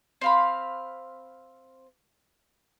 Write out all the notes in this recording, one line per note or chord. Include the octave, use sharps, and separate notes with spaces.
C4 F5 B5